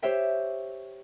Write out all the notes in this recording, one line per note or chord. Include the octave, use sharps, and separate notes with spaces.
G4 C5 C#5 E5 G5